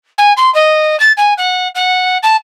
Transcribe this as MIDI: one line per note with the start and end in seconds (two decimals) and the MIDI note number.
0.18 0.33 80
0.37 0.52 84
0.54 0.98 75
0.99 1.12 93
1.17 1.33 80
1.37 1.68 78
1.75 2.17 78
2.22 2.36 81